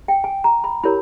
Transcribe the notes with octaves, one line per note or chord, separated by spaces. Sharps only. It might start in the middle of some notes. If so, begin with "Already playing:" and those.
G5
G#5
A#5
B5
E4 G4 A#4 C#5 B5